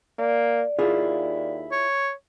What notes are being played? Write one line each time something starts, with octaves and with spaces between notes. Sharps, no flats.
A#3 D5
D#2 E4 F4 G#4
C#5